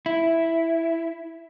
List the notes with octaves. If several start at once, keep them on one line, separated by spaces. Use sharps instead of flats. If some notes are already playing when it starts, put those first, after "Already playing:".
E4